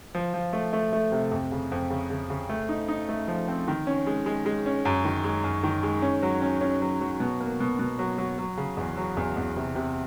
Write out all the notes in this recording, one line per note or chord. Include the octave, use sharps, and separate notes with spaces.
F3
F3
A3
A3
A3
C3
F2
C#3
F2
C#3
C#3
C#3
A3
D#4
D#4
A3
F3
C4
D#3
C#4
G#3
G#3
G#3
C#4
F#2
D#3
G#3
F#2
D#3
G#3
C#4
F#3
C#4
C#4
F#3
F#3
B2
A#3
B2
B2
F#3
F#3
F#3
C#3
E2
F#3
E2
E2
C3
C3